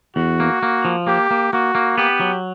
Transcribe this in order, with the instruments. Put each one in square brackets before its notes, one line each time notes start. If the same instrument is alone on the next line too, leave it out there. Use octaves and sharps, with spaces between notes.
[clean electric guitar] E2 [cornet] F#4
[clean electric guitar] A#3
A#3
F3
[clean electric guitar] A#3 [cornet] G4
[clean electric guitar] A#3
[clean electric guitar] A#3 [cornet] F#4
[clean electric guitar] A#3
[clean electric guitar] B3 [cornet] G4
[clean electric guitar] F#3